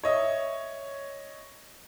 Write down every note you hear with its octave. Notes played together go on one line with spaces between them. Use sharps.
C#5 D#5 E5